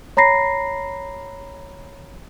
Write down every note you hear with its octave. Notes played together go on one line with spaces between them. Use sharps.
C#5 A#5 B5 A#6 C7